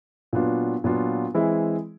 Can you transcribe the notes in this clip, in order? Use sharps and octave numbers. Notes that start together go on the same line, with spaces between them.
A#2 F#3 B3 D4 F4
A#2 F#3 B3 D4 F4
E3 G#3 C4 E4 G#4